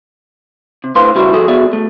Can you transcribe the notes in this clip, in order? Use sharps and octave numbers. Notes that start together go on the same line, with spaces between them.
C3
A2 D3 B4 C5 F5 C6
C#3 G3 E4 F#4
F3 F#4 G#4 A4
B3 F#4 G#4 D5 E5
D2 A3